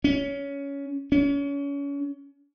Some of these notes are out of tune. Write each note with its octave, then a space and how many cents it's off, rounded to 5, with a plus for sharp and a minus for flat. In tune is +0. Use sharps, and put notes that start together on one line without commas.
C#4 +15
C#4 +30